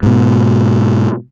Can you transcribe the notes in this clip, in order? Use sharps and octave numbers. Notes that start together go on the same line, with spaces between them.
G#2 B2